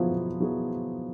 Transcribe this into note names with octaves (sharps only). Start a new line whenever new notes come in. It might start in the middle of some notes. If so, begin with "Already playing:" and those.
Already playing: B2 F3 F#3 B3 E4 G#4
B2
F#3 B3 E4 G#4